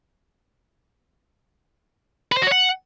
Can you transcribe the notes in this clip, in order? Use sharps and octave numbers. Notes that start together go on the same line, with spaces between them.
B4
C5
F#4
C#5
F#5